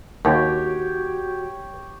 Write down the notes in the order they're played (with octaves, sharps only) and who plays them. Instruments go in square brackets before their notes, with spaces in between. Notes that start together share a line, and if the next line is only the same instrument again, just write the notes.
[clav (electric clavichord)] D#2 [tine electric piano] F#4 [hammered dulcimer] G4 C#5